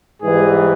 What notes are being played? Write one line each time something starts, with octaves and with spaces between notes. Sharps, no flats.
G#2 E3 G3 G#4